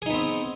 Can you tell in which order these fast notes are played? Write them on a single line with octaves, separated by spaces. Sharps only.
G#4 D#4 B3 C4